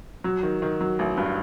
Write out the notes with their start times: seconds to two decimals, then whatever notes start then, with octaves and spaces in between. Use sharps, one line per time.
0.24 F#3
0.43 D#3
0.62 D#3
0.81 F#3
0.99 A1
1.17 G2